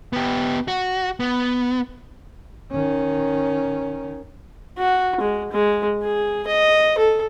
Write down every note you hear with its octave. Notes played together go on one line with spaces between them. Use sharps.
B3 G4
F#4
B3
D#3 C#4
F#4
G#3
G#3
G#4
D#5
A4